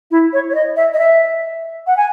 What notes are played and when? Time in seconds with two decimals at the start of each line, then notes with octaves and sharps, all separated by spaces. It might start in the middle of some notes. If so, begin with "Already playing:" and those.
0.11 E4
0.33 C#5
0.50 C#5
0.55 D#5
0.76 E5
0.94 D#5
0.99 E5
1.87 F#5
1.97 G#5